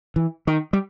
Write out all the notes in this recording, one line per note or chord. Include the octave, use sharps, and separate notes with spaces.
E3
D#3
G3